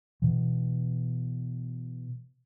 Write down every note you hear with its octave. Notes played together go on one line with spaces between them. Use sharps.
B2 E3